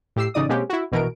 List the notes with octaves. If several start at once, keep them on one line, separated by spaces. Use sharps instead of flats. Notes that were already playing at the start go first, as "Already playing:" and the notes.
A2 G4 E6 C7
A1 C#3 D#4 D5 D#6
B2 G#3 A#3 C4 C#4 G4
E4 F#4
A#1 B2 E3 A#4 D7